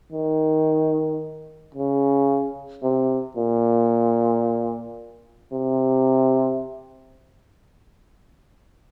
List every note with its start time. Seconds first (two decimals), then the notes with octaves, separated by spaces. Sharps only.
0.12 D#3
1.75 C#3
2.83 C3
3.36 A#2
5.53 C3